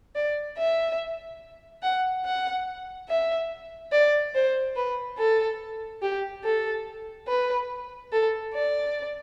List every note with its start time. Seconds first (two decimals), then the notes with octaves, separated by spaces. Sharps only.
0.15 D5
0.58 E5
1.83 F#5
2.25 F#5
3.09 E5
3.92 D5
4.35 C5
4.76 B4
5.18 A4
6.02 G4
6.44 A4
7.28 B4
8.12 A4
8.54 D5